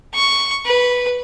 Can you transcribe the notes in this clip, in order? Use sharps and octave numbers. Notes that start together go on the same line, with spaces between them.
C#6
B4